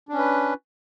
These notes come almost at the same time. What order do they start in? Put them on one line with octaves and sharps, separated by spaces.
D4 C#4 B4